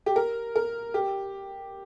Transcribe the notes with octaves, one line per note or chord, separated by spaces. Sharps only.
G4
A#4
A#4
G4